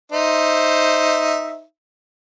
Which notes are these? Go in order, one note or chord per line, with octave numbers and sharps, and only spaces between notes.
D#4 C5 E5